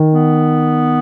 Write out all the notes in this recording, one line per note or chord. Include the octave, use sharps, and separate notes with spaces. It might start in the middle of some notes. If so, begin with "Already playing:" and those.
Already playing: D#3
B3